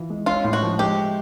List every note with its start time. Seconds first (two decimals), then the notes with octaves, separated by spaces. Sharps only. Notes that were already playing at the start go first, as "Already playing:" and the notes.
Already playing: E3 F4
0.10 G#3
0.26 C#4 F4
0.44 A2
0.53 F#4
0.63 F3
0.79 G#3 G4